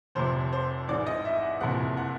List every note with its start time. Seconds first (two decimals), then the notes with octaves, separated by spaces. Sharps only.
0.15 F1 F2 C3 C5
0.53 C5
0.88 A1 G#2 E3 D5
1.06 D#5
1.25 E5
1.43 F#5
1.61 F#1 F2 C3 E3 F#5
1.97 F#5